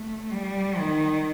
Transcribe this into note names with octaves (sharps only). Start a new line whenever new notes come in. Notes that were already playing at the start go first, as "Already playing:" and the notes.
Already playing: A3
G3
D#3